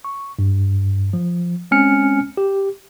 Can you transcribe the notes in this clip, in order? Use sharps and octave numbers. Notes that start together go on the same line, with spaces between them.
C#6
G2
F3
G#3 C4 C#4 G#5 F6 C#7
G4